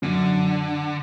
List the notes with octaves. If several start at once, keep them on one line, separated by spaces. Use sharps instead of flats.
F#2 D3